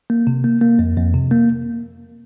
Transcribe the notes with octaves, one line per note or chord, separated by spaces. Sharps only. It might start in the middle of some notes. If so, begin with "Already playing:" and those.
A#3
C3
A#3
A#3
F2
F2
C3
A#3